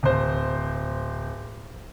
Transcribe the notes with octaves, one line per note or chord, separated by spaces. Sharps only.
D1 C5